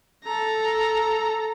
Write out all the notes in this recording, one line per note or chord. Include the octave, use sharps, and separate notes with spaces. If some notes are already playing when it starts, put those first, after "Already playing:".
A4 A#5